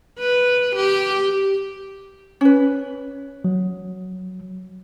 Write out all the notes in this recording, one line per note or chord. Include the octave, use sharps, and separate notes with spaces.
B4
G4
C#4 B4
F#3